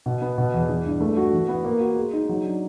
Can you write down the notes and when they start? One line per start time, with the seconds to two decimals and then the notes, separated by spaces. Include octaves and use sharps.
0.06 B2
0.21 B3
0.38 B2
0.54 E2
0.69 E3
0.86 G2
1.01 A3
1.17 F#4
1.33 E3
1.48 B3
1.65 A#3
1.81 F#4
1.96 G#3
2.13 D#4
2.29 F#3
2.45 D4